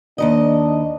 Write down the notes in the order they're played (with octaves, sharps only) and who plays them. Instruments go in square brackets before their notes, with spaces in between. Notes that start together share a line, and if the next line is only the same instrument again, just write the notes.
[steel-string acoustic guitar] D#2 D#3 D#5 [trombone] D4